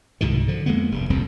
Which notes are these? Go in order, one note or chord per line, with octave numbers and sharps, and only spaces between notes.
C2 G#2 B2 D#3
D3 F3
F2 G#3 A#3 B3
F1 G2
D#1 C2 F2 C4